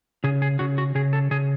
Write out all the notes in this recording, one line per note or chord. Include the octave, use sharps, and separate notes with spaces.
C#3 G#4
G#4
C#3 F#4
F#4
C#3 G#4
A4
C#3 G#4